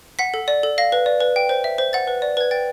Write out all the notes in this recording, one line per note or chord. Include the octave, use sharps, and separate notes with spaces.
F#5 B6
A4
D5
A4
F5 A#6
B4
D5
B4
G5
C5
E5
C5
F#5 A6
B4
D5
B4 G#6
G5 A6